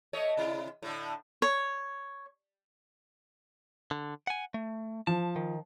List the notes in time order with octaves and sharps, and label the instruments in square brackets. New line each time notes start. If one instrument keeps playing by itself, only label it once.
[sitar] A3 C#5 D#5
C3 E4
A2 D3
[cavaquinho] C#5
[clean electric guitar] D3
F#5 G#5
A3
[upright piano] F3 [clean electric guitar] A5
[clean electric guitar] D#3